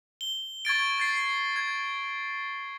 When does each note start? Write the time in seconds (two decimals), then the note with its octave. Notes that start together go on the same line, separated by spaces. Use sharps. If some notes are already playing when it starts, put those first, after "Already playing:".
0.21 G7
0.65 C#6 G#6 A6 D7
0.98 G#6 A6 C7
1.16 C7
1.56 G#6